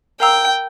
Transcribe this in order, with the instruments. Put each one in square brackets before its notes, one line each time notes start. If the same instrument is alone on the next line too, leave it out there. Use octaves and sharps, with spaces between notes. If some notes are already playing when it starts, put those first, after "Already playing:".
[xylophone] A#4 F5 A#5 E6 G6 [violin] G5